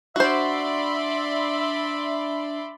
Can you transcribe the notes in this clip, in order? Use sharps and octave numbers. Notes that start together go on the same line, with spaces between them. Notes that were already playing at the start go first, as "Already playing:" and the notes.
D4 F#4 C5 D5 E5 B5 C6